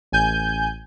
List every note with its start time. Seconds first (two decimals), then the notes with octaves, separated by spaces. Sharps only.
0.12 A1 G#5 G6